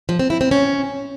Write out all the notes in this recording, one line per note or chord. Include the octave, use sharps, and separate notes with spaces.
F3
C4
E4
C4
C#4